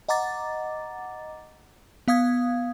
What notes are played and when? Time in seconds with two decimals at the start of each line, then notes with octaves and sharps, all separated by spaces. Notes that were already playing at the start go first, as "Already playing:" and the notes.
0.08 D#5 F#5 A#5 D6 A6
2.08 B3 F5 D#6 G#6